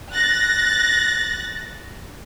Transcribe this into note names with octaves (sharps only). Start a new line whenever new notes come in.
F#6 A6 A#6